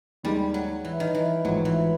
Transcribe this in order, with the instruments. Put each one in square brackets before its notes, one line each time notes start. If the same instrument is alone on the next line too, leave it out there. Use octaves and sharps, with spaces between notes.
[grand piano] D#2 D#3 G#3 [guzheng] G3
[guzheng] F#3
E3
D#3
E3
[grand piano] A1 G#2 F3 [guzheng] F#3
[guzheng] E3